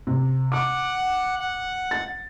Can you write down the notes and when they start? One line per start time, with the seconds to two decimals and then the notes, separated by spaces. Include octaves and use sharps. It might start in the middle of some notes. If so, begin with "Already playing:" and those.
0.07 C3
0.52 F#5 D6
1.39 F#5
1.91 A6